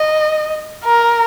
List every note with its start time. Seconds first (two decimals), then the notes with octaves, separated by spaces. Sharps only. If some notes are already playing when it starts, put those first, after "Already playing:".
Already playing: D#5
0.85 A#4